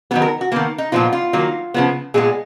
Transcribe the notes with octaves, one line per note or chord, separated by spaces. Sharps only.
D#3 F#3 B3 B4
A#4
F#4
D#3 A#3 B3
D#4
A#2 F3 B3 F4
F4
D#3 F#3 A#3
C#3 F3 B3
A#2 G#3 B3 G#4